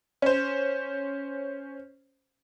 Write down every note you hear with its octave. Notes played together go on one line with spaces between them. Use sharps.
C#4 C5